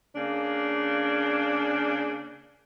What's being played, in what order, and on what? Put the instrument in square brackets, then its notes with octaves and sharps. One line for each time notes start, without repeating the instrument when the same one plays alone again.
[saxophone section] C#3 A#3 D4